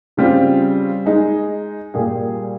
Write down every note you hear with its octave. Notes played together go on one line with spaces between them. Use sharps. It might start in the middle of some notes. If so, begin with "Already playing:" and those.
C#3 G3 C4 F4
G#3 D#4 G#4
A#2 G3 A#3 F4 G#4